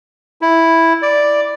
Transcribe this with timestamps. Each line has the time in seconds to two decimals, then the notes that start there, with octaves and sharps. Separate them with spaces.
0.42 E4
1.02 D5